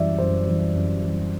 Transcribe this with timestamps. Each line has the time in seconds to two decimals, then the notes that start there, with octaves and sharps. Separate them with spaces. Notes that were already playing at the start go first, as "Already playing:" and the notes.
Already playing: F#2 E3 G3 D5 E5
0.18 F#2 C5
0.46 E3 G3
0.74 F#2
1.02 E3 G3